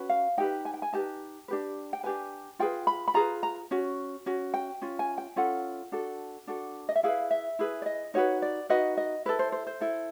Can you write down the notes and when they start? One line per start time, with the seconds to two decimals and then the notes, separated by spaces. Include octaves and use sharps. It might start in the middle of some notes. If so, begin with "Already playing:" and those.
Already playing: C#4 F#4 B4
0.09 F5
0.38 D#4 G4 B4 G5
0.65 G#5
0.74 G5
0.82 G#5
0.93 D#4 G4 B4 A5
1.48 D4 G4 B4
1.93 G5
2.03 D4 G4 B4 G#5
2.59 F4 G#4 B4 G5
2.87 B5
3.08 B5
3.14 F4 G#4 B4 A#5
3.43 A#5
3.71 C#4 F#4
4.26 C#4 F#4
4.54 G5
4.82 C#4 F4
4.99 G#5
5.18 G5
5.36 C#4 F4 A4 F#5
5.92 D4 F#4 A4
6.47 D4 F#4 A4
6.89 D#5
6.96 E5
7.03 E4 G#4 B4 F5
7.31 E5
7.59 E4 G#4 B4
7.82 D5
7.86 D#5
8.14 D#4 F#4 B4 C#5
8.42 D5
8.70 D#4 F#4 B4 D#5
8.97 D#5
9.26 E4 A4 B4
9.39 C5
9.52 C5
9.67 C5
9.81 E4 A4